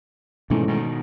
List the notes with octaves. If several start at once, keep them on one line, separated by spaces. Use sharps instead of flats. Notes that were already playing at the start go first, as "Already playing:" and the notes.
G#2 B2 D#3 E3 A3 C#4
B2 D#3